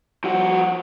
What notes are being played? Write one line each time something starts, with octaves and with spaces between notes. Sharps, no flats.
F3 F#4